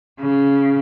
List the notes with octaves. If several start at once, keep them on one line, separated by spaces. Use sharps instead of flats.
C#3